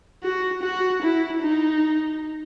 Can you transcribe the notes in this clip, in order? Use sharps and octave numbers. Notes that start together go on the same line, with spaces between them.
F#4
F#4
E4
D#4